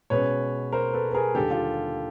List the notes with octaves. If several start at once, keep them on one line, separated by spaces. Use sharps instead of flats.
B2 G#3 C#4 B4 C#5
A#4 C5
A4 B4
B4
G#4 A#4
D#2 D3 G3 G4 A4
F4 G4